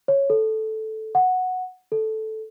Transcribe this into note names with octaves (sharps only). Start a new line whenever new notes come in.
C#5
A4
F#5
A4